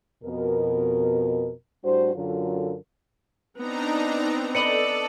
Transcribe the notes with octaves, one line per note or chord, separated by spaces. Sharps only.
F2 B2 A#4
A2 G3 D4 F#4 C5
F#2 D3 F#3 F4 A4 A#4
B3 C4 D4 D#4 A#5
A4 B4 D5 D#5 C#7 D#7 F#7